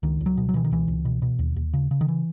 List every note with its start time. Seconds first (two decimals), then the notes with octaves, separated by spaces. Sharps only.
0.03 C#2 D#3
0.21 C#2
0.26 F#3
0.37 B2
0.49 F#3
0.54 B2 E3
0.64 D#3
0.71 C#2 E3
0.88 C#2
1.05 B2
1.22 B2
1.39 D#2
1.56 D#2
1.74 C#3
1.91 C#3
2.01 D#3
2.08 E3